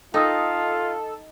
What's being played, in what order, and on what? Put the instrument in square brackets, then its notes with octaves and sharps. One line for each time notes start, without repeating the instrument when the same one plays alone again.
[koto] D#4 [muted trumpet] F4 [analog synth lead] A4 [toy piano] G5 D#6 E6